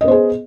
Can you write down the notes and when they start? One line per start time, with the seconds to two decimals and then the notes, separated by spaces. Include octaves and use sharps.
0.01 D#5
0.04 B3
0.08 C5
0.11 G#4